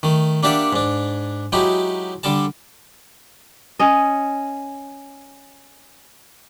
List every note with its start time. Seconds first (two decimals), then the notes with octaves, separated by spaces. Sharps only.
0.03 D#3 A3
0.43 A#3 D4 G4 D5 E5 F#5
0.73 G#2 D4
1.52 F#3 G#3 D#4 E4 G4
2.23 D3 G3 A4 A5
3.79 C#4 D#5